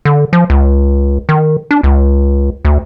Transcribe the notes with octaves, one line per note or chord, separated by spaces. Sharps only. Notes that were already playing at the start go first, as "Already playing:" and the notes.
D3
F3
C#2
D#3
D4
C#2
D2